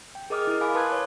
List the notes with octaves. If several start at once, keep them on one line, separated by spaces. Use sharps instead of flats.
G5
G#4 A#4 D#5 D6 D#6 F6
E4 A#4
F5 G#5 B5 D6
B4 A5 C6 D#6 F#6 G#6
B4 C#5